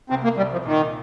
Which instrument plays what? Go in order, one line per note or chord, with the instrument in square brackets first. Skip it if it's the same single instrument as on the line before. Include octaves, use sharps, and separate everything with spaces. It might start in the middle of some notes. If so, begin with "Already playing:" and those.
[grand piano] C2 [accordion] C4
[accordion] A#3
[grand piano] C2 [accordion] G3
[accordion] F3
[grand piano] A#2 [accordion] D#3